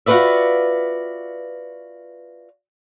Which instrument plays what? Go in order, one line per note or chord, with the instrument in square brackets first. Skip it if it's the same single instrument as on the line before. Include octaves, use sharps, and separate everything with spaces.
[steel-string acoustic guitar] F4 F#4 G#4 B4 D5 E5